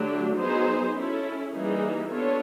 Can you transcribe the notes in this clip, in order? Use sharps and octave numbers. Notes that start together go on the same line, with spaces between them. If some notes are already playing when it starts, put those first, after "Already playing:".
Already playing: D3 F#3 A3 D4 G4
F#3 B3 D#4 G#4 C5
C#4 E4 A4
E3 G3 A#3 D#4 G#4
B3 D4 F4 A4 C#5